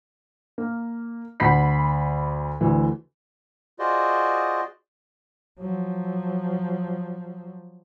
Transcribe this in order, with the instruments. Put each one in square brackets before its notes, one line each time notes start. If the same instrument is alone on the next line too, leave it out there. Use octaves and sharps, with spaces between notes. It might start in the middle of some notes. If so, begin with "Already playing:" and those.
[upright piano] A#3
D2 F#5 B5 B6 C7
D2 E3 A3
[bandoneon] F4 F#4 G#4 C5 D5 D#5
[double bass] F3 F#3